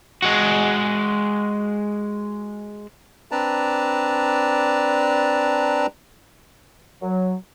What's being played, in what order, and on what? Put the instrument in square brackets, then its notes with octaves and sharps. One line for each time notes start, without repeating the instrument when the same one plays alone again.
[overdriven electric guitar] G#3 F#4
[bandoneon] C4 D4 B4 D5 A5 A#5
[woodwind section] F#3